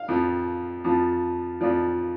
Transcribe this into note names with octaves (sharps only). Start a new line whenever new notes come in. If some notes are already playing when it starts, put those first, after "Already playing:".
Already playing: F5
F2 F3
F2 F3
F2 F3 D5